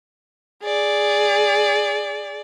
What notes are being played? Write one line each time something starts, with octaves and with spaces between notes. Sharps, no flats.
G#4 D5